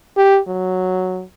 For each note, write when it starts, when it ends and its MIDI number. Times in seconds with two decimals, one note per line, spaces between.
0.17 0.39 67
0.48 1.23 54